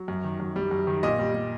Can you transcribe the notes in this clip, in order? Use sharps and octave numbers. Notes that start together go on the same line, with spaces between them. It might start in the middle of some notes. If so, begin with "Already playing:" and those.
Already playing: F#3
F#2
D#3
F#2
G3
F#2
D#3
A#2 D#5
G3
G3